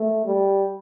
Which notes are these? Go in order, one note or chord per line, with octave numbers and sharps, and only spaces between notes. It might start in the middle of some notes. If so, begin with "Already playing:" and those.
Already playing: A3
G3